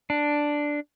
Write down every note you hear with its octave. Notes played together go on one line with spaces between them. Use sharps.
D4